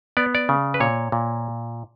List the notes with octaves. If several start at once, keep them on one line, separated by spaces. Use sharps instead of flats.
B3 D5
D5
C#3
B4
A#2 C#5
A#2